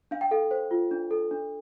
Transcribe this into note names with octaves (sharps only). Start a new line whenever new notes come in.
D4 F5
G5
A4 F5
C5
F4
D4
A4
D4